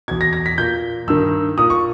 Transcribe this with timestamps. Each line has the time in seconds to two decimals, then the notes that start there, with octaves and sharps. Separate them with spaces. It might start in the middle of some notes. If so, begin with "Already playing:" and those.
0.08 B2 G#6
0.11 E2
0.21 A#6
0.33 A#6
0.46 B6
0.58 A#2 G6
1.07 G2 D#3 E6
1.57 A#2 D#6
1.70 C#6